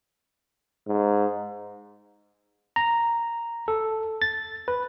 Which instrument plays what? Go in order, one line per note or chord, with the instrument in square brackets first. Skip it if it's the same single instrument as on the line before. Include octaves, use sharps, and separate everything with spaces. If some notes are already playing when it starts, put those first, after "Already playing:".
[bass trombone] G#2
[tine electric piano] A#5
A4
A6
B4